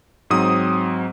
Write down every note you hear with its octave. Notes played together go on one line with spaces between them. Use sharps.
G#2 F#3 C4 D#6